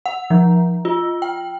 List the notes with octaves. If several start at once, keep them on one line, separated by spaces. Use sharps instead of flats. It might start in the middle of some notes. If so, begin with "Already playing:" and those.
F#5
F3
F4
G5